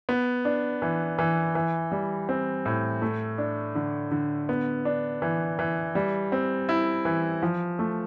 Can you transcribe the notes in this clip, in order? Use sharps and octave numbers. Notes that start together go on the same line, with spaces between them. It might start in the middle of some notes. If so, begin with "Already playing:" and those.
B3
D4
E3
E3
E3
G3
C4
A2
A3
D4
D3
D3
B3
D4
E3
E3
G3
C4
E4
E3
F3
A3